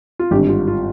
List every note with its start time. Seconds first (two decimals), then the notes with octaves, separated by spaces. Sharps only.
0.19 F4
0.31 G#1 G2 D3 G4
0.49 F4
0.68 F4